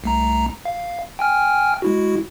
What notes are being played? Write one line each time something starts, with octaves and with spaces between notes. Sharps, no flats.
C2 A3 A#5
F5
G5 G#5 F6
G#3 E4 F#4